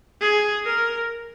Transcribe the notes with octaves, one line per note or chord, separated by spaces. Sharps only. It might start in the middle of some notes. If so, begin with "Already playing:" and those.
G#4
A#4